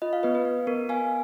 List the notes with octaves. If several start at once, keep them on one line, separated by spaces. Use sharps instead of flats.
F4 D#5
F5
B3 B4 D#5
B4
B3
B3 A#4
B3 F5 G#5